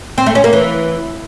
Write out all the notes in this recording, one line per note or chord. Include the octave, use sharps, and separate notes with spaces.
C4
A3
C#4
A#3
E3